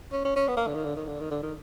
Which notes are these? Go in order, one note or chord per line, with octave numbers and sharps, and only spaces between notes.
C#4
C#4
C#4
B3
A#3
D3
D#3
D3
D#3
D3
D#3
D3
D#3